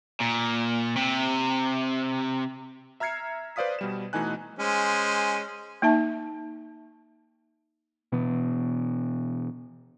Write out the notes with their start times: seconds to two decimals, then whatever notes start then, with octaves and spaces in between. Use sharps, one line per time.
0.20 A#2
0.96 C3
3.00 E5 A#5 F6 G#6 C7 C#7
3.56 B4 C5 D5 F5 D#6 B6
3.79 B2 G3 E7
4.13 B2 E3 A3 D#4 G#5 F#6
4.59 G#3 C#4 C5
5.82 A#3 D#4 E5 A5
8.12 B2 E3 B3